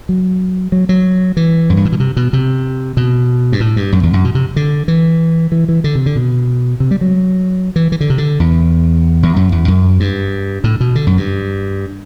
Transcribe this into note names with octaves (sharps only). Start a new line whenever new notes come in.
F#3
F#3
F#3
E3
F#2
G2
A2
B2
C3
B2
C3
B2
G2
A2
G2
F#2
E2
F#2
B2
C3
D3
E3
E3
E3
D3
C3
D3
B2
C3
G3
F#3
E3
E3
D3
C3
D3
E2
E2
F#2
E2
F#2
G2
A2
B2
D3
F#2
G2